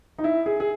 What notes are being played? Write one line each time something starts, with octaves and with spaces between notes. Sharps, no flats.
D#4
E4
G#4
G#4